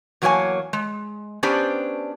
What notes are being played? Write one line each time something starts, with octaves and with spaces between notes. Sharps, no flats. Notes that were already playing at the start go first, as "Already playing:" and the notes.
E2 F#3 A#3 F4 C#5 G#5
G#3
B3 C#4 D4 G4 C5 D5